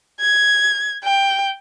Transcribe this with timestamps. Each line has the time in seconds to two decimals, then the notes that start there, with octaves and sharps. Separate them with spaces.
0.20 G#6
1.04 G5